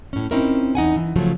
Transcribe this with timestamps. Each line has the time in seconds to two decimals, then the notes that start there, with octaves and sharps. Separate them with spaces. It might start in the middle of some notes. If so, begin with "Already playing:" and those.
0.13 A2 C#4
0.31 C4 C#4 D#4 E4 A#4
0.75 E2 D#4 F#5 G#5
0.96 E3
1.16 C#3 F3 F#3 A3